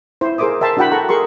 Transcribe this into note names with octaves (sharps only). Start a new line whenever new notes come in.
E4 C5
G#4 A#4 C5 E5 D6 D#6
A#4 E5 G5 A5 C6
D4 E4 F#4 F#5 G5 B5
A4 F#5 A5 A#5 C#6
G#4 A#4 C6 C#6